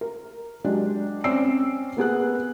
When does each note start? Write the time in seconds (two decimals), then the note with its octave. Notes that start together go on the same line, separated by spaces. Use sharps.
0.01 A#4
0.64 F#3 G#3 D4 G4
1.24 C4 C#4 D5 E6 C7 D7
1.97 A#3 B3 G#4 F#6